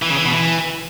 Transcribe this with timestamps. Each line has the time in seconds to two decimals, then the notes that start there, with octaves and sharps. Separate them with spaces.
0.02 E3
0.10 C#3
0.18 E3
0.25 B2
0.33 E3